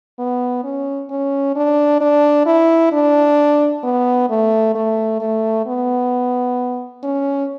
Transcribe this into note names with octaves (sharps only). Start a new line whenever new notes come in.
B3
C#4
C#4
D4
D4
E4
D4
B3
A3
A3
A3
B3
C#4